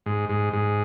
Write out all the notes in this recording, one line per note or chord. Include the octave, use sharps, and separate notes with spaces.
G#2
G#2
G#2